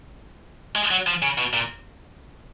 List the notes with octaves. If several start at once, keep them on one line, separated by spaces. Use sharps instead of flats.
G#3
F#3
F3
C#3
B2
A#2